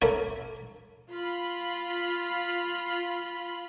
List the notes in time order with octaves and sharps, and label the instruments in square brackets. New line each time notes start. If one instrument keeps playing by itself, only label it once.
[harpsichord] A3 A#3 E4 C#5
[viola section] F4 B5